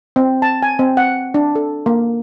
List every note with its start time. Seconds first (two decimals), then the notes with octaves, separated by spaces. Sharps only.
0.16 C4
0.42 A5
0.63 G#5
0.79 C4
0.97 F#5
1.34 D4
1.55 A4
1.86 A#3